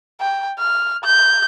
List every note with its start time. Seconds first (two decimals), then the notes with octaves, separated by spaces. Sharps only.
0.21 G5
0.59 F6
1.04 G6